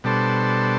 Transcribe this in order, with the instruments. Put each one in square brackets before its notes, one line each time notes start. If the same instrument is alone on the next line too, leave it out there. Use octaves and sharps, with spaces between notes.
[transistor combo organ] B2 G3 D4 A4 C5